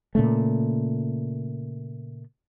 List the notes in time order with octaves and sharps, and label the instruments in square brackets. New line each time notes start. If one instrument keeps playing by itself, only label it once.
[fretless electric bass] A#2 C#3 A3